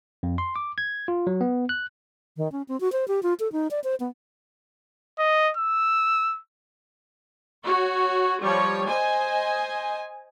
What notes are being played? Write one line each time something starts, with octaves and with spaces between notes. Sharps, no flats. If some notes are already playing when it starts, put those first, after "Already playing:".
F2
C6
D6
G#6
F4
F#3
B3
F#6
D#3
C#4
C4
F#4
C5
G4
F4
A4
D#4
D5
C5
B3
D#5
E6
F#4 C#5
F3 G3 C#5
C5 D#5 G#5